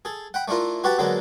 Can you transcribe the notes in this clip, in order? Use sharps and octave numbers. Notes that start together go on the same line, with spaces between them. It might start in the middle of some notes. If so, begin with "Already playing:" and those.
G#4 A4
F#5 G5 B5
A3 D4 E4 F4 A#4
F#4 G4 B4 F#5 A5 B5
D3 F#3 G#3 A#3 B3 A4